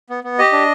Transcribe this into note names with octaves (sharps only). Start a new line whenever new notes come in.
B3
B3
G4 D#5
D4